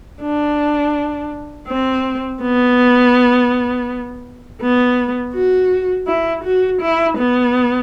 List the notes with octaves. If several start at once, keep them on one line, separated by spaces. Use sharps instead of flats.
D4
C4
B3
B3
F#4
E4
F#4
E4
B3